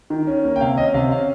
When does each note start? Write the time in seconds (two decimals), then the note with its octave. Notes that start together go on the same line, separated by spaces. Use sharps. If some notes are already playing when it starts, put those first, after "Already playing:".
0.10 D#3
0.27 C#4
0.44 A#3
0.56 G5
0.61 C3 F5
0.77 C#4 D#5
0.94 C3 F5
1.11 C#4 F5